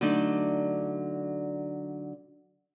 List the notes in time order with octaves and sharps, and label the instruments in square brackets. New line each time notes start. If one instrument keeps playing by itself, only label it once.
[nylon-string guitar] D3 F#3 A3 D4 D#4